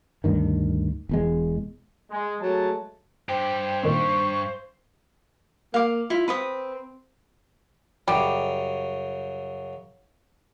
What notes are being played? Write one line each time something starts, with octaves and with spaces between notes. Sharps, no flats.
D2 G2 D#3
E1 E2 G#3
G#3
F#3 G#3 A3 A5
G2 G4 C5 G5
A#2 D#3 C4 C#6
A#3 F5 D6
E4 F4
C4 B4 B5 D#6
F#2 C#3 G3